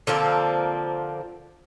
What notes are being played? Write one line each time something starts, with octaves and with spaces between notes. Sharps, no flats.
D3 F3 A#3 C4